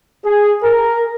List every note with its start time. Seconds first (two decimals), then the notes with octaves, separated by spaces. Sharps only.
0.25 G#4
0.63 A#4